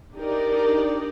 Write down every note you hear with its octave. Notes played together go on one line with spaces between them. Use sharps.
D4 D#4 G4 A#4 D5